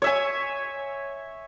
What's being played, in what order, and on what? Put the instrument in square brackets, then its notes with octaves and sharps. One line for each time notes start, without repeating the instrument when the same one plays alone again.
[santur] C#5 E5 G#5